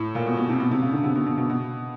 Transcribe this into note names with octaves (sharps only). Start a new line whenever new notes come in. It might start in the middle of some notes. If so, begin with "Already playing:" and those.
Already playing: A2
A#2
B2
B2
C3
B2
C3
C#3
D3
C3
B2
B2
B2
B2